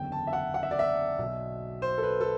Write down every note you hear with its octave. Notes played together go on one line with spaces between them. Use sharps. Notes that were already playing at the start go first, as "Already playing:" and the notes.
Already playing: F#1 E2 D3 G5
A5
E5
F#5
F#5
E5
D5
E5
B1 B2
C5
A4
B4
A4